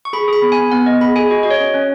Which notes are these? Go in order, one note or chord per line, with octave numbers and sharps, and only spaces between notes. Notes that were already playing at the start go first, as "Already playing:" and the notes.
C#6
G#4 B5
G#4 B5
B3
G#5
B3
B3 F#5
B3 D#5
G#4 B5
G#4 G#5
F#4 D#5
F#4 D#5
C#5
C#4
C#4